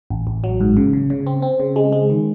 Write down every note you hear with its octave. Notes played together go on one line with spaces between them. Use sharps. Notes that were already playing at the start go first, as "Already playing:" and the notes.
A1
A1
F#3
G#2
C#3
C#3
C#3
C4
C4
C#3
G#3
G#3
D#3